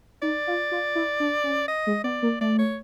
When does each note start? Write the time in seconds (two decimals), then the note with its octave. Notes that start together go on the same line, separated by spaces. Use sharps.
0.22 D#4 D5
0.47 F4
0.72 F4
0.95 E4
1.20 D4
1.44 C#4
1.68 D#5
1.87 G#3
2.04 B3 D5
2.22 A#3
2.41 A3 D5
2.59 C#5